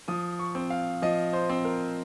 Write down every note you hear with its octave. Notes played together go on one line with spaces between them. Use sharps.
F3 D#6
C#6
C4
F5
F3 D#5
C5
C4
A#4